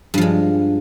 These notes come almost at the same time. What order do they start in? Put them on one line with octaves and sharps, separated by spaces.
G2 F3 G#3